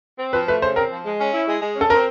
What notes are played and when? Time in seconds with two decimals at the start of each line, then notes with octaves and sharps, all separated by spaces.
0.19 C4
0.33 F3 B4
0.48 A3 B4
0.62 C#3 C5
0.76 C4 A#4
0.90 F3
1.05 G#3
1.19 C#4
1.33 E4
1.48 G#3
1.61 G#3
1.76 C#4
1.81 A4
1.90 C4 A#4